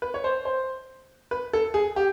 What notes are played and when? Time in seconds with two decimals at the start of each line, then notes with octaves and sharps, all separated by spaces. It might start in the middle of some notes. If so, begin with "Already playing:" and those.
0.02 B4
0.14 C#5
0.24 C5
0.45 C5
1.31 B4
1.53 A4
1.74 G#4
1.96 G4